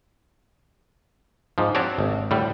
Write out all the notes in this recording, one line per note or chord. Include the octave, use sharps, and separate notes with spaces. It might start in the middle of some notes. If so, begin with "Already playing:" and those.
G#2 F3
C4 D4 F#4 G4 C#5 D5
G#1
A2 D3 G3